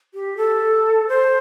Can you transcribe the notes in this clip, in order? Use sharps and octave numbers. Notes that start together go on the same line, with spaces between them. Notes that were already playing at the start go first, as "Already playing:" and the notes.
G4
A4
C5